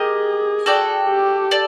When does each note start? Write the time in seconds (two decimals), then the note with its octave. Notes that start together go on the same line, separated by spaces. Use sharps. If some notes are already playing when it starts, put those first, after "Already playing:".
Already playing: G4 G#4 A#4 D#5
0.66 F#4 A4 D5 G5
1.09 G4
1.51 A4 D5